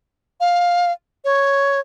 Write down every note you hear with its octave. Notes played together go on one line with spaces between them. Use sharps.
F5
C#5